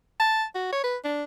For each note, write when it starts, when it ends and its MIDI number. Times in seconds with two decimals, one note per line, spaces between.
0.20 0.44 81
0.55 0.71 66
0.72 0.84 73
0.84 0.97 71
1.04 1.23 62